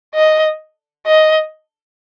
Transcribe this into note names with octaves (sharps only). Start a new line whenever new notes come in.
D#5
D#5